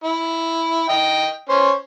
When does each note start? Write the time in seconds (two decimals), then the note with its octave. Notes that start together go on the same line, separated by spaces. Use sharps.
0.04 E4
0.89 D#5 G5
1.49 C#4 C5